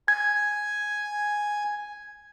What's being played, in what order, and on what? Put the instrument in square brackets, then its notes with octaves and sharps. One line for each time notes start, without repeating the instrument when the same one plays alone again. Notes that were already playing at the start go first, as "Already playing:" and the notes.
[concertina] G#5 [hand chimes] G#6